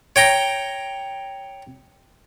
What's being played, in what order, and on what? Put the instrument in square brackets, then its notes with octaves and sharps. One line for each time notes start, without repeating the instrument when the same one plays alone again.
[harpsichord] C#5 G5 A#5